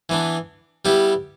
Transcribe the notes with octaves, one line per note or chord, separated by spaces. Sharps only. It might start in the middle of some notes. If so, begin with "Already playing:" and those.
E3 B3 D4
G3 B3 E4 G4